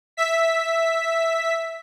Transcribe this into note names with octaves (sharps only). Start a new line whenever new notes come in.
E5 B6